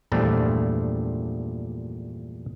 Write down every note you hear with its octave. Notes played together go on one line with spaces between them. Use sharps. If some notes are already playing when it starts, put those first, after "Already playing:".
E2 G2 A#2 F3 A3 D4